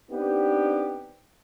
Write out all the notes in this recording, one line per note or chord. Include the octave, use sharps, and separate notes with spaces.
B3 C4 D4 D#4 G4